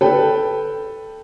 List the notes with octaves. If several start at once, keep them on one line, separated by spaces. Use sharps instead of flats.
A4 B4 G5